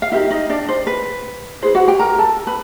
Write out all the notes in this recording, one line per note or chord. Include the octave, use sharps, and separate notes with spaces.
F5
D#4 E4 G4 A#4 E5
D#4 D#5
D4 D5
C5
B4
E4 G#4 B4 C5
F#4 F#5
G4 G5
A#4 A#5
A4 A5
B4 B5